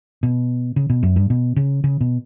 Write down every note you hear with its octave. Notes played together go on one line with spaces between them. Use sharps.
B2
C#3
B2
F#2
G2
B2
C#3
C#3
B2